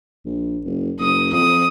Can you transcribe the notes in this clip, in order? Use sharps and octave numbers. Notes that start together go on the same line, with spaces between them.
A#1
F#1
F#1 D#6
F2 D#6